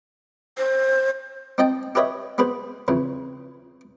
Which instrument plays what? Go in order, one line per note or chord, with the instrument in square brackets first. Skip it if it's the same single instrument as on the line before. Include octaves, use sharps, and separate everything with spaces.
[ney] C5
[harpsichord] C4 D#4 D#5 G5 A5
G4 A4 B4 C#5 D#5 E5
B3 G#4 B4 C5
F2 C#3 E3